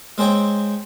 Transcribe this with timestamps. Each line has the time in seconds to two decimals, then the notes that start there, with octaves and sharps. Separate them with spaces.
0.18 G#3 C4 C5 C#5 G5